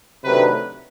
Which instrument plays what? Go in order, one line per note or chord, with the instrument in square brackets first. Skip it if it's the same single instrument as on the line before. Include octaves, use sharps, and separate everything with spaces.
[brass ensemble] C3 D#3 F#3 A3 D4 B4